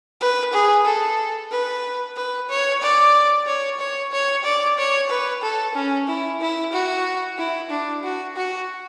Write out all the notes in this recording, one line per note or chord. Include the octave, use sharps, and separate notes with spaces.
B4
G#4
A4
B4
B4
C#5
D5
C#5
C#5
C#5
D5
C#5
B4
A4
C#4
E4
E4
F#4
E4
D4
F#4
F#4